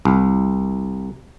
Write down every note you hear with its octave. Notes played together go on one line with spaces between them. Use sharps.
C2